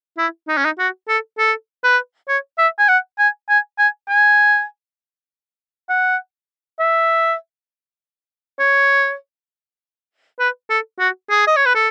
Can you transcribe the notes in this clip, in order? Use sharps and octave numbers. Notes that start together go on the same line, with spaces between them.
E4
D#4
C#4
D#4
F#4
A4
A4
B4
C#5
E5
G#5
F#5
G#5
G#5
G#5
G#5
F#5
E5
C#5
B4
A4
F#4
G#4
D#5
C#5
B4
A4